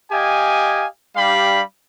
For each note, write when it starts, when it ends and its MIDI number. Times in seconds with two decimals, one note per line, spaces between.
0.12 0.85 67
0.12 0.85 75
0.12 0.85 77
0.12 0.85 80
1.16 1.61 55
1.16 1.61 62
1.16 1.61 67
1.16 1.61 77
1.16 1.61 83